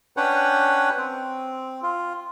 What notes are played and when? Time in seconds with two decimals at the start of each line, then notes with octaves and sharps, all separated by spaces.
0.17 C#4 D4 B4 C#5 F#5 G5
0.97 C4
1.83 F4